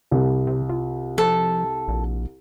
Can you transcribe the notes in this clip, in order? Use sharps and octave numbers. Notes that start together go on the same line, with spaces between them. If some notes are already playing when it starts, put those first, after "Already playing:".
C2
C3
F4
F3 A4
A#1